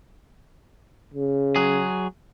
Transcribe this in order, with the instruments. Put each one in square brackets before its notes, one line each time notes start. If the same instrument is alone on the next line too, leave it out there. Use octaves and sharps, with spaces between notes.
[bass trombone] C#3
[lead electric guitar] F#3 G#4